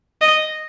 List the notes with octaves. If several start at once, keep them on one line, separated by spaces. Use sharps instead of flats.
D#5